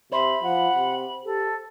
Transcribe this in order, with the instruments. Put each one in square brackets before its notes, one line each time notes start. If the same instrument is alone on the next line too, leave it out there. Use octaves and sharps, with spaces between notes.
[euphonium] C3 [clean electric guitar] C5 [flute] E5 [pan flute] B5
[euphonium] F3 [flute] F#5
[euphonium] C3
[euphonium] G4 [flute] A4